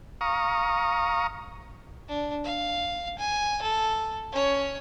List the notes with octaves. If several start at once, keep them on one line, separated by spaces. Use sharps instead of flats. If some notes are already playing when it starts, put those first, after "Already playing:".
F5 A#5 C#6 D#6
D4
F5
G#5
A4
C#4 C#5